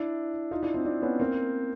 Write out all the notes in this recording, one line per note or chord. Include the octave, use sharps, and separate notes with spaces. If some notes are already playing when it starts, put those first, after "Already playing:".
Already playing: D4 E4
D#4 F4
D4 E4
C4 D4
C4 D4
B3 C#4
A#3 C4